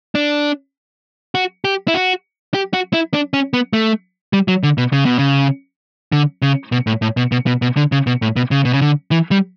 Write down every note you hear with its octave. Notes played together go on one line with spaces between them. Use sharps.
D4
F#4
G4
E4
F#4
G4
F#4
E4
D4
C#4
B3
A3
G3
F#3
D3
B2
C#3
B2
C#3
D3
C#3
B2
A2
A2
B2
B2
B2
B2
D3
C#3
B2
A2
B2
C#3
B2
C#3
D3
E3
G3